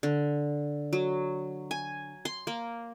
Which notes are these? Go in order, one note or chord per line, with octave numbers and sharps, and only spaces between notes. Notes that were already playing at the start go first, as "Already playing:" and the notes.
D3
F#3
G#5
C6
A#3